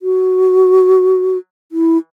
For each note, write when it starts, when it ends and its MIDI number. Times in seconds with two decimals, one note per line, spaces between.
0.01 1.38 66
1.72 1.98 64